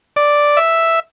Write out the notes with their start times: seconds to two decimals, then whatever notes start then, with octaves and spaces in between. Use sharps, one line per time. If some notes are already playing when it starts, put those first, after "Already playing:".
0.16 D5
0.57 E5